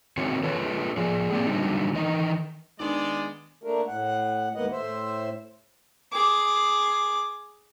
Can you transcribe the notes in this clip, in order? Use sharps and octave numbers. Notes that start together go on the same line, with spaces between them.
D#3 C4 E4 F#4 C#5
F4 A4 B4 C#5
F3 G#4
A#3 C4 G4 G#4 D5
D3 F#3 G3 D#4
D#3 E3 D#4 D#5
D#3 G#3 B3 D4 D5
A3 A#3 D4 A#4
A2 F#5
D#2 G#2 A#3 B3 D#5 F#5
A2 C5 E5
G#4 D6